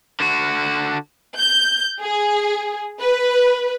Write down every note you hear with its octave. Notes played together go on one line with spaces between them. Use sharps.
D3 F#4
G6
G#4
B4